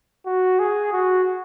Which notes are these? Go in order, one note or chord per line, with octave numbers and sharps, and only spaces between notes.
F#4
G#4
F#4